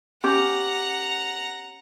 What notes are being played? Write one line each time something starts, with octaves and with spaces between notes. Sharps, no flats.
C#4 G4 F#5 A#5